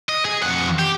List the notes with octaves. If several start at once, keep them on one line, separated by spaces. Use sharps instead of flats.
D#5
G#4
F2 F#5
G4